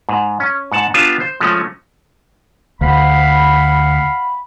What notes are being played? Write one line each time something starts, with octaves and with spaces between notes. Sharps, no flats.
G#2
C#4
G#2 F#5 A5
B3 D4 F4 G4 G#5 A5
C5
F3 G#3 A3 C#4
D2 F5 F#5 B5